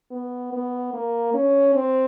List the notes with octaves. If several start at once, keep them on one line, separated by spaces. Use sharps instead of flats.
B3
B3
A#3
C#4
C4